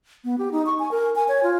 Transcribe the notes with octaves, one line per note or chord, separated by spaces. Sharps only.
B3
G4
D#4
C#6
G#5
A#4
G#5
C#5
F4